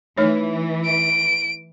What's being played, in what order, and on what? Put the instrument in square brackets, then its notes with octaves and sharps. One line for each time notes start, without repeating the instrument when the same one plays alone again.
[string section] E3 [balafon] A3 D#4 C#5
[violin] D7